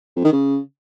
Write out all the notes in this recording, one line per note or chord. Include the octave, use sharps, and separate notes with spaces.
F2
D#3
C#3